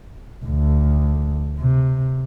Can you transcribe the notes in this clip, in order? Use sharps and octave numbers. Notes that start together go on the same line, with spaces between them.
D2
C3